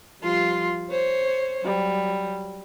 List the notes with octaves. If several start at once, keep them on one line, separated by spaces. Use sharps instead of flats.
F3 G3 F4 C6
C5 C#5
F#3 G3